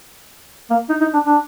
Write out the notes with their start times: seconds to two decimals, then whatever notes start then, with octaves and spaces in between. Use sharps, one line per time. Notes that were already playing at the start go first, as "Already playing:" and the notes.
0.71 A#3
0.89 D#4
1.01 D#4
1.14 D4
1.26 D4